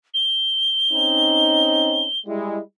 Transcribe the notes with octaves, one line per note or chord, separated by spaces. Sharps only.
G7
C4 C#4 D#4
G3 G#3 E4